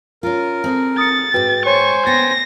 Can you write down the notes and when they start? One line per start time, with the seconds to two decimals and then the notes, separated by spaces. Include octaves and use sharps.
0.23 C#4 F4 A#4
0.64 C4 G#4 A4
0.98 D#6 A6 C#7
1.34 G#2 F#4 B4 G5
1.66 C5 C#5 G#5 C#6
2.07 B3 G5 A6 A#6